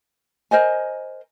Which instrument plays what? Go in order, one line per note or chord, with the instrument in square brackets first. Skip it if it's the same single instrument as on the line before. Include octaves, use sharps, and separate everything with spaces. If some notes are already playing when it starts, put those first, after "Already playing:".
[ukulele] A#4 C5 D#5 G#5